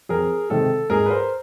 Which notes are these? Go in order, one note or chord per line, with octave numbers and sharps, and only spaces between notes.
F2 G#4 A#4
C3 D#3 G#3 A4
G#2 G#4 A#4
B4
A#4 C5